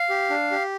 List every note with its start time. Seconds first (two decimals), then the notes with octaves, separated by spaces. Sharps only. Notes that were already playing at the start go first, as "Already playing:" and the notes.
Already playing: F5
0.10 G4
0.30 D4
0.51 G4